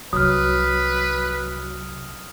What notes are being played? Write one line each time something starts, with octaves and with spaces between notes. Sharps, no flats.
C2 C3 F#3 B4 D#6 F6